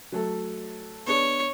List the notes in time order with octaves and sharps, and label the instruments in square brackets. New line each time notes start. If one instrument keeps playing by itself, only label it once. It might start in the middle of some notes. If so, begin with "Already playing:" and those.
[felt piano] F#3 A3 A4
[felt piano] B3 D4 G#4 [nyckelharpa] C#5